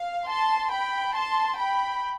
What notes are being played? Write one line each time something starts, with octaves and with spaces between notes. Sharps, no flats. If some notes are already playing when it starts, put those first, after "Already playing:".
Already playing: F5
A5 C6
G5 B5
A5 C6
G5 B5